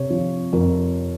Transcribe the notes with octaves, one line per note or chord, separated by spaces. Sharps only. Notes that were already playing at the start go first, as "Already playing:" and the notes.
Already playing: C3 C#5
F3
F2 A#4